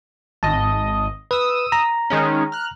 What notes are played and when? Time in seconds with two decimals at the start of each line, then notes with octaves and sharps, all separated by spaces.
0.43 G#1 D#5 A5
1.31 B4 D#6 E6
1.72 A#5
2.10 D#3 G#3 C#4
2.52 F6 F#6